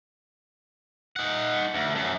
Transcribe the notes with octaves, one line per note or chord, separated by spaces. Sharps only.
D#4 F#5
D2
F#2